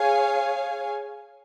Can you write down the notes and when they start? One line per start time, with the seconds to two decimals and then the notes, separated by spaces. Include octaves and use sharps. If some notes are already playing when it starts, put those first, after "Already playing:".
Already playing: G#4 C#5 F5 G#5